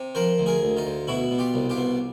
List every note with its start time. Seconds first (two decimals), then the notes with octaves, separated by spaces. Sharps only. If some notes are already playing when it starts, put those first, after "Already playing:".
Already playing: C3
0.15 F3 A#4 C5
0.38 D2
0.46 G#4 A#4
0.62 D2
0.77 D#4 F4
0.85 D2
1.07 B2 E4 F#4
1.31 B2
1.38 F4 G4
1.54 C2
1.69 F4 G4
1.78 B2